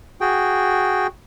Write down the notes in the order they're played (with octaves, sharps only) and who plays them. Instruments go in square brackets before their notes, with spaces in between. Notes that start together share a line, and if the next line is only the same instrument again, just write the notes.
[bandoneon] F#4 G#4 G5